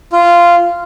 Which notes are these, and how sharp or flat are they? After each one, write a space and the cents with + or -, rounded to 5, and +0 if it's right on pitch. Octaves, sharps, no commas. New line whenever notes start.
F4 -10